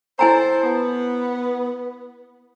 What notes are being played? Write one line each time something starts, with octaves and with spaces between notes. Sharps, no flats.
E4 A4 C5 G#5 A#5
B3